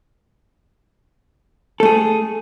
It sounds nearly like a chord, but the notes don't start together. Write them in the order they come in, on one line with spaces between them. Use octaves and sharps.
A4 A3 G#4